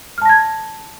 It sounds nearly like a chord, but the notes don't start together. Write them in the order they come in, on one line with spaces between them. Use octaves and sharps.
F6 A5 A#6 G#6